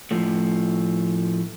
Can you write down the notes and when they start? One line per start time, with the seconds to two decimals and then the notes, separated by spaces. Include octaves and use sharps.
0.11 A2 F3 A3